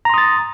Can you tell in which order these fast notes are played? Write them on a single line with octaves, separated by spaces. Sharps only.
A#5 C6 D#6 A6